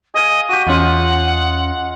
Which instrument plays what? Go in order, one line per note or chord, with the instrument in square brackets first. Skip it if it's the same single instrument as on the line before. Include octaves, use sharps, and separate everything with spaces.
[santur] G#4 F5 G#5 [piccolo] D#5
[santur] F#4 G4 [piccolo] D#7
[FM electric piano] E2 C#4 [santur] G#3 F4 [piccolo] F#5